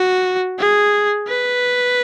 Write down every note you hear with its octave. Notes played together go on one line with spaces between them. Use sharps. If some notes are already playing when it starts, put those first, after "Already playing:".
Already playing: F#4
G#4
B4